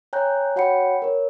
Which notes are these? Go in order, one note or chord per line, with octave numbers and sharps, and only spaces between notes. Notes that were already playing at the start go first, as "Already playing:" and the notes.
C#5 G5 G#5 A#5 F#6 G6
F#4 C#5 F#5 G5 B5 C#7
A#4 C#5